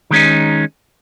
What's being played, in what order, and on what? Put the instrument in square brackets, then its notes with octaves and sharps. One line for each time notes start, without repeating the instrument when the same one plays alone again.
[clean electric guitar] D#3 G#3 C#4 D#4